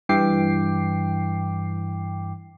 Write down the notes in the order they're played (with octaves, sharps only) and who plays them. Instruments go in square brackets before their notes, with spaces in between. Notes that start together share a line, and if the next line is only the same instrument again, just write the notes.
[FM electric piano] G2 E3 G5 D6 C7